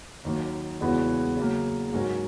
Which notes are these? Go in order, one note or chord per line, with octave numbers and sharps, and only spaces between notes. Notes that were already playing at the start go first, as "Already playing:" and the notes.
D#2 D#3 F#3 A#3
E2 C#3 G#3 B3 F#4
C#3 F#3 A#3
G#2 F#3 C#4 F#4 A#4